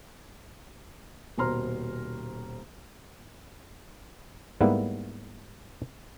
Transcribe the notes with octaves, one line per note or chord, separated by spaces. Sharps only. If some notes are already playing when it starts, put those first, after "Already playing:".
D#1 B2 C5 A#5 C6 F6
G#2 G3 A#3 B3 E4